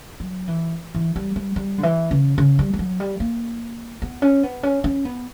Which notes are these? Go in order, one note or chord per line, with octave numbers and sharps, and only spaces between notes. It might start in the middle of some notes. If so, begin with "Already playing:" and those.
F#3
E3
E3
G3
G3
G3
D3
E3
C#3
C#3
G3
G3
F#3
G3
A#3
B3
C#4
B3
C#4
C#4
B3